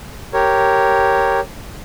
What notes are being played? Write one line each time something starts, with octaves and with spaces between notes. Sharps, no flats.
G4 A#4 C#5